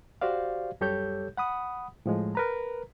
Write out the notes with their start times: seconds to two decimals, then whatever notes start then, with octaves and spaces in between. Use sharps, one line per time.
0.21 F#4 G4 C5 D5 F5
0.81 F#2 G3 G4 A4 C#5 G6
1.37 F#5 B5 D#6
2.06 A2 F3 G#3
2.35 A#4 B4 A#5